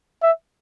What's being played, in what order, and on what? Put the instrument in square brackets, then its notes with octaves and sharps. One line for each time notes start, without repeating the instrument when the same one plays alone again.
[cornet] E5